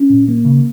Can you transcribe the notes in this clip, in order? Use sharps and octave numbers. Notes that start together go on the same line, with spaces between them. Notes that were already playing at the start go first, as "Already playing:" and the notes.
Already playing: C#4
A#2
A#3
C#3